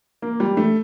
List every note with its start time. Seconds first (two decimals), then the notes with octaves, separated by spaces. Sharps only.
0.22 A#3
0.40 G3
0.57 A3